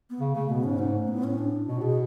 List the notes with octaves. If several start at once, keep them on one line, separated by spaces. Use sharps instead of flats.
B3
C#3
C#3 A3
B2 B3
G#2 C#4
G#2 A3
A2 B3
C#4
D4
B2 F#4
A2
B2 G#4